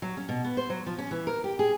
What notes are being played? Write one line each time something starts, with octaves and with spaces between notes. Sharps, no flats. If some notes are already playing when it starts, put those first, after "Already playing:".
F#3
C#4
B2
B3
C5
F#3
F3
C#4
E3
A#4
G4
G#4